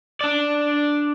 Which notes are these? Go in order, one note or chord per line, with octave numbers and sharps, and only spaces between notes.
D4 D5